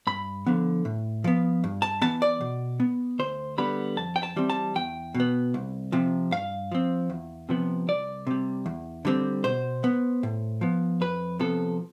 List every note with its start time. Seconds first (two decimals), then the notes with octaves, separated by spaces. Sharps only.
0.07 G2 B5
0.46 D3 F3 B3
0.85 A2
1.24 F3 B3
1.64 G2
1.82 A5
2.02 E3 B3 A5
2.22 D5
2.41 B2
2.80 B3
3.19 D2 C5
3.58 D3 G3 B3 B5
3.97 F2 A5
4.16 G5
4.23 A5
4.36 E3 G3 C4
4.50 A5
4.75 E2 G5
5.15 B2
5.20 B3
5.54 C2
5.92 C3 F3
6.31 G2 F5
6.72 F3 C4
7.10 E2
7.49 C3 F3 B3
7.88 C2 D5
8.27 C3 G3
8.66 E2
9.05 D3 G3 C4
9.44 B2 C5
9.84 B3
10.23 A2
10.61 F3 B3
11.01 F2 B4
11.39 C3 F3 B3 A4